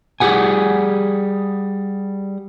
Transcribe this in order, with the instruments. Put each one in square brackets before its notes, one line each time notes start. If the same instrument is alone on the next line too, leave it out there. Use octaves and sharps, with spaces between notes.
[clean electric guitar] G3 G4 G#4 F#5 G#5